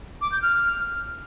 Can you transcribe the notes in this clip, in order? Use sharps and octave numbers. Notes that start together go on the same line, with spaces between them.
D6
G6
F6